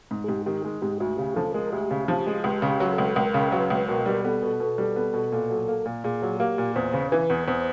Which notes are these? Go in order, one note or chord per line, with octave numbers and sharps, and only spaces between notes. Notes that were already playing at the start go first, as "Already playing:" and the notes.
G#2
G#4
G#2 G4
D#3 G4
G#3
G#2 G4
D2 F#4
C#3 G4
F3 A4
G#3 A#4
D2 G4
C#3
F3 G4
G#3
C#2 G4
C#3
G4
F#3
A4
C#2
C#2 A#4
C#3
F#3 B4
C#2
B2 A#4
G3
B3 A4
B2
B2
G3
B3
B2
A#2
F#3
A#3
A#2
A#2 G#4
F#3
A#3 G4
A#2
E2 C5
C#3
E3 B4
E2
E2 C5